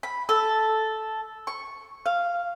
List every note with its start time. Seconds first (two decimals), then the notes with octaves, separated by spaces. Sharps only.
0.03 B5
0.29 A4
1.47 C#6
2.06 F5